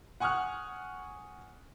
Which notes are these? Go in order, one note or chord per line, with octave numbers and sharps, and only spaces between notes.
F#5 G#5 C#6 D#6 F6 F#6